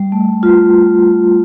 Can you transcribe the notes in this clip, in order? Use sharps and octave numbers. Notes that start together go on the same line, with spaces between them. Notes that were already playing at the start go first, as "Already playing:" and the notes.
Already playing: G3
A3
F4